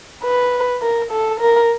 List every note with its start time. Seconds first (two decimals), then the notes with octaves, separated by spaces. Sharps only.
0.24 B4
0.82 A#4
1.11 A4
1.40 A#4